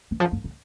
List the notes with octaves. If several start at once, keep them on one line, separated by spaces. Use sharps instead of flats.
E3
F3
G2
A2